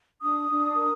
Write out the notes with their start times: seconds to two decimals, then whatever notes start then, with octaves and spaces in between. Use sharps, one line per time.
0.22 D4 D#6
0.50 D4
0.76 A#4